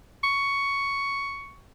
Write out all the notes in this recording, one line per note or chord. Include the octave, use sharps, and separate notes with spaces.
C#6